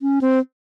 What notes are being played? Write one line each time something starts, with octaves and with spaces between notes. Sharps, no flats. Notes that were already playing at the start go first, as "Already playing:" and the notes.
C#4
C4